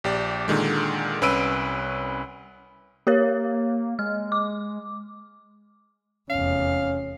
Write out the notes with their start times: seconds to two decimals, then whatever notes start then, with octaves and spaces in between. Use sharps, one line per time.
0.04 A#1 G4 D5
0.48 A#2 D3 D#3 G#3
1.22 C2 C#4 B4 E6 D7 D#7
3.07 A#3 G4 A#4 C#5
3.99 G#3 F6
4.32 D6
6.30 F1 E2 C#4 F5